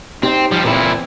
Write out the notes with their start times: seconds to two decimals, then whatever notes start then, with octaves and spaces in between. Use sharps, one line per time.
0.23 C4 D#4 G4
0.51 F3 G3
0.65 E2 A#2 C4 E4